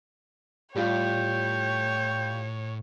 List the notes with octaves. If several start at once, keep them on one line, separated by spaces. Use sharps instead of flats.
A2 G3 F4 G4 C#5 G5